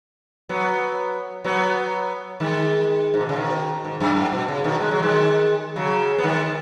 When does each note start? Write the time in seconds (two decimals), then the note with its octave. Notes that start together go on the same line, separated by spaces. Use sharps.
0.49 F#3 B3
1.44 F#3 B3
2.40 D#3 G#3
3.14 G#2
3.21 B2
3.29 C#3
3.36 B2 D#3
3.85 G#2
4.00 F#2
4.16 G#2
4.33 B2
4.48 C#3
4.64 B2 D#3
4.81 G#3
4.91 F#3
5.02 D#3 G#3
5.76 C#3 F#3
6.18 B3
6.23 D#3 G#3